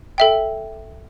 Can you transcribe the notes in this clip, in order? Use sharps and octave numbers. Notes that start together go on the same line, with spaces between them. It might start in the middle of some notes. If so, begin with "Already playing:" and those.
A4 E5 G5